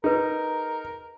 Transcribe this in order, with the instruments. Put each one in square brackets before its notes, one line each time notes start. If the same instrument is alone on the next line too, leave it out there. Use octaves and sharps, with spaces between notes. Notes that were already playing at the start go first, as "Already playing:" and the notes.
[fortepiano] D#4 [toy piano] G#4 B4 [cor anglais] A#4